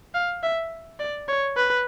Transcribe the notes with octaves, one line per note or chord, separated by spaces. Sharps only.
F5
E5
D5
C#5
B4